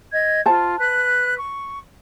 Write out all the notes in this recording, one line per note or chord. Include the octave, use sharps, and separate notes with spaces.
D#5 G#6
F4 C5 A5
B4 F#6
C#6